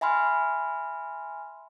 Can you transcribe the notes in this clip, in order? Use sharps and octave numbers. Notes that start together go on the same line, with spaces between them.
E5 G#5 B5 C6 F6